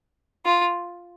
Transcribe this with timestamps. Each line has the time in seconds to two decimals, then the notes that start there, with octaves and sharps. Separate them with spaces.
0.46 F4